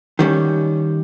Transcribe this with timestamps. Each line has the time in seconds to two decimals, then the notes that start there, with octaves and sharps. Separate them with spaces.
0.19 D#3 G3 C#4